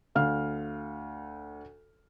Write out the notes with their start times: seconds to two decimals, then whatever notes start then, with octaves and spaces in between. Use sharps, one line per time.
0.15 D2 F5 F6